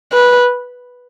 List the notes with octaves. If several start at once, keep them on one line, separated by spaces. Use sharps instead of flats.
B4